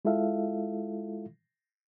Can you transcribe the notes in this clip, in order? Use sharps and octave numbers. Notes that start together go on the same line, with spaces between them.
G#3 E4 F4 A4 E5 F5